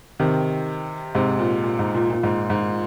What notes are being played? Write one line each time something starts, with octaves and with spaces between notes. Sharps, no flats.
C3 D#3
G#2 C3
A#2
A#2
G#2
A#2
A#2
G#2
G#2